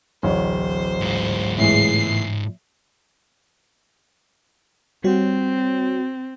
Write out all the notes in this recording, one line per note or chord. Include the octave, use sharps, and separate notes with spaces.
D1 A1 C5 C#5
G#2 F4
A2 E3 G#3 C7
G3 C4 F#4 C#5